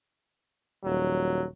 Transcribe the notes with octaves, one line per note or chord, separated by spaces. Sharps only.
D#1 F#3